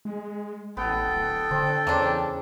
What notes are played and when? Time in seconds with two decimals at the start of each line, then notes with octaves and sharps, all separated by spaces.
0.05 G#3
0.77 A1 B3 A4 G5
1.07 D1
1.51 D3 C4
1.87 E2 C#3 A#3 C4 D4